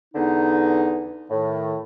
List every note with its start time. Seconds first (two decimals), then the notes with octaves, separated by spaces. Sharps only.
0.15 E2 D3 B3 D#4
1.30 A2 D#3